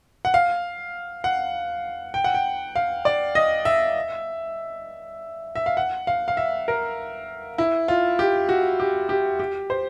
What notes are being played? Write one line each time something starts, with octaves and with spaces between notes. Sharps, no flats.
F#5
F5
F#5
G5
F#5
G5
F5
D5
D#5
E5
E5
F5
F#5
F5
F5
E5
A#4
E4
F4
G4
F#4
G4
G4
G4
C5